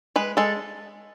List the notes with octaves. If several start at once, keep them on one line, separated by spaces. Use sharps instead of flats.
G#3 B4
G#3 A4